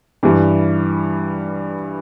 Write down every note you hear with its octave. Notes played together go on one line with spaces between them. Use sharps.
G2 E3 G3